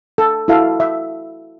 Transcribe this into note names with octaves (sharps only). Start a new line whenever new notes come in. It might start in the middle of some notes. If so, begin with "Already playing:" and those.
A4
E4 F#4 A4 E5 F5
E5